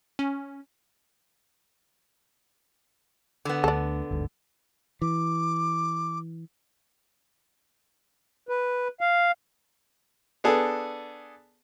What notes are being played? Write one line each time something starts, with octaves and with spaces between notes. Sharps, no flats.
C#4
D3 B3
D2 D4 A4
G1 D2 G#2
E3 D6
B4
F5
B3 D4 G#4 A4